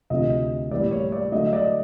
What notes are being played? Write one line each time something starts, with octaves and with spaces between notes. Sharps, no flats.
D2 C3 F3 D#5
A2 E3 G3 A#3 D5
C#5
D5
D3 F#3 A3 D#5
D#5
D5